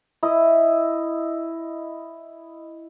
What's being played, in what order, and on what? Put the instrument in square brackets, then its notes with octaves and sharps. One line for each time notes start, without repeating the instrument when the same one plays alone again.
[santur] E4 D#5